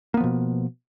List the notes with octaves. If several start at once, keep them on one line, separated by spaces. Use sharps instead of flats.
B2 F3 A#3 B3